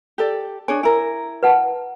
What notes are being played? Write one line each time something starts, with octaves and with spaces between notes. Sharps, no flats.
G4 A4 D5
D4 G#4 C#5 G#5
E4 A#4 G#5
B4 F#5 A5